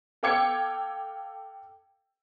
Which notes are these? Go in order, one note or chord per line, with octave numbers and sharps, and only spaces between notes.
A4 F5 G5 D6 G#6 C#7